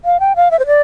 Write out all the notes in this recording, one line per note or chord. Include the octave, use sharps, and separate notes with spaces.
F5
G5
F5
E5
C5
D5